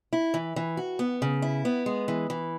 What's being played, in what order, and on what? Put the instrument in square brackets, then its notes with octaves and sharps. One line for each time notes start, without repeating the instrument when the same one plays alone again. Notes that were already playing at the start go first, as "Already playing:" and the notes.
[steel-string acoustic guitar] E4
E3
E3
F#4
B3
C#3
E4
B3
G#3
E3
E3